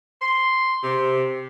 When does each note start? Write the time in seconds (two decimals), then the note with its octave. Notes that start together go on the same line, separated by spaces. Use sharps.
0.22 C6
0.84 C3